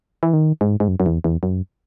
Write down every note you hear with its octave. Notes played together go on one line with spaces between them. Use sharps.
E3
D#3
G#2
G#2
F#2
F#2
E2
E2
F#2